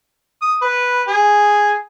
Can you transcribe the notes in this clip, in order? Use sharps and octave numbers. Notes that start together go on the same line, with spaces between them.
D#6
B4
G#4